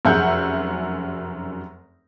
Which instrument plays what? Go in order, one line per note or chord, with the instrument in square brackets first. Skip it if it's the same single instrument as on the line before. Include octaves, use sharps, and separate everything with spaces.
[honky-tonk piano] F1 F#2 G#4 E5 F#5 G6